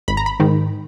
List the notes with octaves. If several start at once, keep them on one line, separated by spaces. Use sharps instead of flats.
G#1 B5
A#5
B5
G#2 D#3